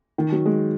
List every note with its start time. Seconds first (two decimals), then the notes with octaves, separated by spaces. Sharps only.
0.18 D#3
0.32 F#3
0.46 G#3